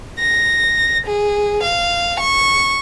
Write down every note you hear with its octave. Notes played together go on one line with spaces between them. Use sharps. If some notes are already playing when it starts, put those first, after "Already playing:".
A#6
G#4
F5
C#6